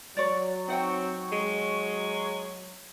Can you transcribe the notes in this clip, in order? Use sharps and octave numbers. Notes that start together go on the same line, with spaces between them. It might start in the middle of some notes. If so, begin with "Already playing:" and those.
F#3 C#5 D5
C4 D#4 F#5 G5 C#6
G#3